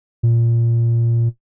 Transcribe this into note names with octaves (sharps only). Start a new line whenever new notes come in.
A#2